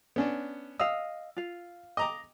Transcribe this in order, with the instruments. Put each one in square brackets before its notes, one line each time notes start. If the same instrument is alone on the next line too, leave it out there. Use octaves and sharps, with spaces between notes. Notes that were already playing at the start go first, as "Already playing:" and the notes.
[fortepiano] B3 C#4 D4
[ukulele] D#5 F5 [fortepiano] E6
[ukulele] F4 F5
[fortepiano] D#5 A#5 D6